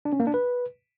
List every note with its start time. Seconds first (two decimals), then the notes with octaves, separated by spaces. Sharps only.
0.05 D4
0.13 C#4
0.20 A#3
0.27 D4
0.34 B4